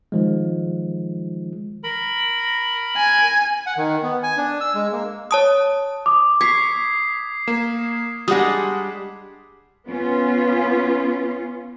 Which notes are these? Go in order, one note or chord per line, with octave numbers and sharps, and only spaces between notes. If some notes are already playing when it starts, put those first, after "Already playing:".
D#3 F3 G#3
A#4 B5
G#5
F#5
D#3
B3
G#5
D4
E6
G#3
A#3
C#5 A5 D#6
D6 D#6
C#6 G#6 B6 C7
A#3 E7
G3 G#3 D4 F#5 D#6
B3 C#4 F4